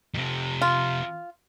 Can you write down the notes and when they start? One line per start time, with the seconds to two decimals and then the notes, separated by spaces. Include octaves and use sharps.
0.14 F2 C3
0.61 F4